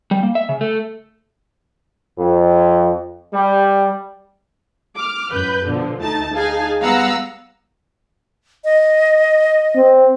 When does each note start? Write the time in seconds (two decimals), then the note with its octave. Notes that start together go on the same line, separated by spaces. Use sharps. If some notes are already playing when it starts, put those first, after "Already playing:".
0.11 G3
0.23 A#3
0.35 E5
0.49 C#3
0.61 A3
2.18 F2
3.34 G3
4.97 D6 F6
5.31 F#2 B4 G6
5.66 B2 D3 F3
6.01 D2 A3 D#4 A5 A6
6.34 D#4 G#4 F5 G#5 A5
6.82 G3 B3 F5 F#5 A#5 E6
8.64 D#5
9.76 C4